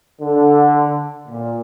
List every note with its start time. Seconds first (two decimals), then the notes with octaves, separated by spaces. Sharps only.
0.21 D3
1.28 A#2